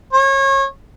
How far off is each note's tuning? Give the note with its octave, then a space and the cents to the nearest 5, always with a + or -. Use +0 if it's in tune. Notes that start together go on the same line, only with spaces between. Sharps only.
C#5 -30